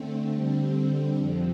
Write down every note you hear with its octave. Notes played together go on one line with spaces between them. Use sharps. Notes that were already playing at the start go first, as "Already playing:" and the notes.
Already playing: D3 A3 C4
D3 G3 C4
F2 C3 F3